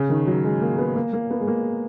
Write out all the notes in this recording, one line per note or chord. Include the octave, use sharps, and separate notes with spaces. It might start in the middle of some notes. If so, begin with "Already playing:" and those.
Already playing: C#3
D#3
F#3
G#3
A#3
B3
A#3
A#3
B3
G#3
A#3